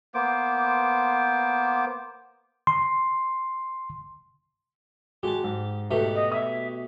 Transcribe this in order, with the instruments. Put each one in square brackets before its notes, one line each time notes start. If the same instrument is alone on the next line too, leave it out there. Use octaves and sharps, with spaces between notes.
[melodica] A#3 B3 C5 D6
[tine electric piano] C6
[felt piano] G#3 F#4 [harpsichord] G4 A5
[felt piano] G#2
[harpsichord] B2 A3 G4
[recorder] D#5
[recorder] E5 [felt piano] D#6